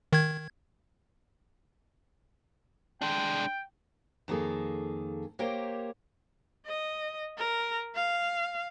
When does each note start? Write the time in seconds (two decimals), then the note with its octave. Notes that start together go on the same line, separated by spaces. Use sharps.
0.13 D#3 G#6
3.02 G#3 D4 G5
4.28 F2 D#3 A#3 G#4 A4
5.39 A#3 G4 A#4 C5 C#5 G5
6.66 D#5
7.38 A#4
7.95 F5